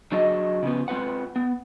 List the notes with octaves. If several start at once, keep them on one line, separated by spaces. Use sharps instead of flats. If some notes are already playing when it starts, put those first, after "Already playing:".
F#3 D4 G#4 D#5
C#3 F3 B3
G#3 C4 F4 B4 F#5
B3